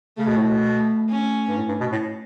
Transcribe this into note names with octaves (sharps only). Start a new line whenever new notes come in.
C#3 A3
B2
A2
B2
A3
C#4
G2
A2
G2
B2
A2